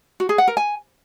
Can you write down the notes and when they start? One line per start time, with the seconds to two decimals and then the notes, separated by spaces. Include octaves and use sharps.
0.20 F#4
0.29 G#4
0.38 F#5
0.48 A#4
0.57 G#5